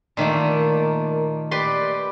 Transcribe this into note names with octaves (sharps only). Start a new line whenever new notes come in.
A#2 D#3 A3 A#3
G4 B4 D5 C6